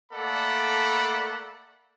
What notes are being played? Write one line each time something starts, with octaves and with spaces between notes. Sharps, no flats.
A3 A#3 A4 D5 F#5 B5